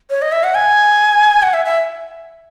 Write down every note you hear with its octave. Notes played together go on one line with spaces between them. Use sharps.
C#5
D#5
E5
F#5
G#5
F#5
E5
E5